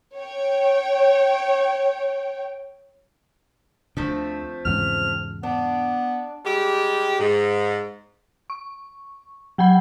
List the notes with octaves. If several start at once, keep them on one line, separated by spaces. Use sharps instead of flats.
C#5 G5
D2 D3 F3 A3 C4
E2 G#2 C#3 F6
B3 D4
G3 G#3 G4
G#2
C#6
F#3 F#5 G5 B5